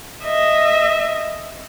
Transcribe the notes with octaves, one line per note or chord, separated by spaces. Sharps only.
D#5 E5